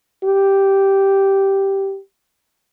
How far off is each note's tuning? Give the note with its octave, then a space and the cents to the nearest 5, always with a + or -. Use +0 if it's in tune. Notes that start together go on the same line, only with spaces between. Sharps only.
G4 -5